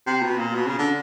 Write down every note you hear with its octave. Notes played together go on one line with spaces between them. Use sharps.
C3
B2
A#2
B2
C#3
D3